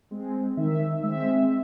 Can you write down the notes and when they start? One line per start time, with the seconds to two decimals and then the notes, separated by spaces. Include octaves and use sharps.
0.11 G#3 C4
0.57 D#3 E5
1.03 G#3 C4 E5